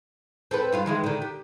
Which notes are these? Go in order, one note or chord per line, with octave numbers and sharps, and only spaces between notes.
C4 A4 B4
G2 F4 F5
D#3 E3 G#3
D3 D#3
G4